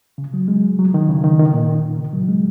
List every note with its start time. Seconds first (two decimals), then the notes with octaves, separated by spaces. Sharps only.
0.18 C#3
0.34 F#3
0.48 G#3
0.79 F#3
0.94 D#3
1.09 C#3
1.24 D#3
1.39 D#3
1.54 A#2
1.98 C#3
2.13 F#3
2.28 G#3